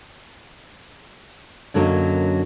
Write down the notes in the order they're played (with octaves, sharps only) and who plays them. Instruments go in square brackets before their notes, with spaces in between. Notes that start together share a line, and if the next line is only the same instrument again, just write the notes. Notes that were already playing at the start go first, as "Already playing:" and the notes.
[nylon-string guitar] F#2 D3 F#3 A#3 C#4 D#5